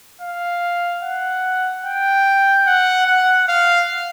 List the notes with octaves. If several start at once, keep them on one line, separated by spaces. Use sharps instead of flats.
F5
F#5
G5
F#5
F#5
F5